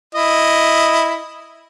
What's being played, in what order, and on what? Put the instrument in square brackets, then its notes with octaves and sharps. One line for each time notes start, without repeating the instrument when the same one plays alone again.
[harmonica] E4 D#5